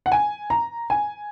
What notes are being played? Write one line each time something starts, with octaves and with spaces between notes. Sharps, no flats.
F#5
G#5
A#5
G#5